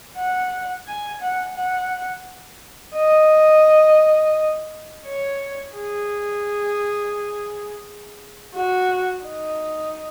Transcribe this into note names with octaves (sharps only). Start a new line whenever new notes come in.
F#5
G#5
F#5
F#5
D#5
C#5
G#4
F#4
D#4